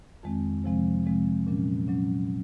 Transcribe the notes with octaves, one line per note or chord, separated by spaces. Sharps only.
F2 D#3 G#3 C4
C3 F3 G#3 C4
C3 F3 G#3 C4
A#2 F#3 C#4
A#2 F#3 C#4